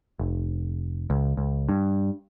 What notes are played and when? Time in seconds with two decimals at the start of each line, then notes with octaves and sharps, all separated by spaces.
0.19 F1
1.10 C#2
1.37 C#2
1.69 G2